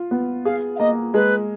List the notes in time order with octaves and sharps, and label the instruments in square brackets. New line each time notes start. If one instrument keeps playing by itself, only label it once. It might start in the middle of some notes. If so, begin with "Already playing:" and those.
Already playing: [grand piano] F4
B3
[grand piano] G#4 [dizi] F5
[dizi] F5
[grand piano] A#3 [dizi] D#5
[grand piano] G#3 [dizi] B4